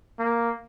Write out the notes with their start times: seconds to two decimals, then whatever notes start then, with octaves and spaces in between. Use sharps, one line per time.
0.19 A#3